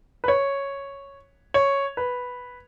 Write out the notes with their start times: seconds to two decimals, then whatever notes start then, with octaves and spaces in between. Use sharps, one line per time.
0.24 B4
0.28 C#5
1.54 C#5
1.97 B4